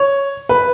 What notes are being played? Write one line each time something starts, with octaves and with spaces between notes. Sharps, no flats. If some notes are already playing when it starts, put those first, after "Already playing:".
Already playing: C#5
B4